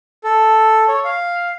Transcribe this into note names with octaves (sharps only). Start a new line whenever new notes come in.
A4
C#5
F5